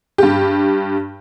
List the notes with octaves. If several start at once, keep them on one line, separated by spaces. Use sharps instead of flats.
G2 G4